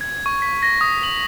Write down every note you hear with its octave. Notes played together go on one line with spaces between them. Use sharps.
G#6
C#6
B6
A#6
D#6
F#7